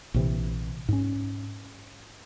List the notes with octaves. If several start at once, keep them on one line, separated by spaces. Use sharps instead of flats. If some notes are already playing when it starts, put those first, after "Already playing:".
A#1 C3 E3
G#2 C#4